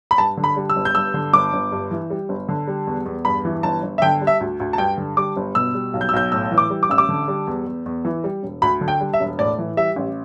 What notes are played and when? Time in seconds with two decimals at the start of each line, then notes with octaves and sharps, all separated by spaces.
0.11 B5
0.18 G2 A5
0.37 D3
0.44 B5
0.56 G3
0.70 E6
0.76 G1
0.85 G6
0.95 G2 E6
1.14 D3
1.33 G1 D6
1.53 G1
1.72 G2
1.91 E3
2.10 G3
2.29 G1
2.49 D3
2.67 G3
2.87 E2
3.05 E2
3.25 G2 B5
3.45 E3
3.63 G1 A5
3.83 G1
3.98 E5
4.02 D3 G5
4.21 G3
4.27 E5
4.40 D2
4.60 D2
4.73 A5
4.78 G2 G5
4.97 D3
5.17 G3 D6
5.37 G1
5.55 B2 E6
5.74 G3
5.93 B1
6.01 G6
6.09 E6
6.13 B1 G6
6.32 A2 E6
6.51 E3
6.58 D6
6.70 G3
6.83 D6
6.90 A1 E6
6.98 D6
7.09 D3
7.28 G3
7.47 E2
7.66 E2
7.86 E2
8.05 E3
8.24 G3
8.43 E1
8.62 D2 B5
8.81 D3
8.88 G5
9.01 G3
9.14 E5
9.20 E1
9.39 A2 D5
9.58 E3
9.77 G3 E5
9.96 A1